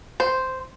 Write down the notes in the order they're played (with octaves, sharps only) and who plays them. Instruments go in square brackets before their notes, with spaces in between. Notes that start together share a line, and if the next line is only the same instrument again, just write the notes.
[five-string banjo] C5